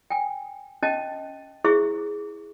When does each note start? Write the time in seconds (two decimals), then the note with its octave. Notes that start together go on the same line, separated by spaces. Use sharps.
0.10 G5 G#5
0.83 C#4 D#5 G5 A5
1.64 E4 G#4 C5 E5 C#6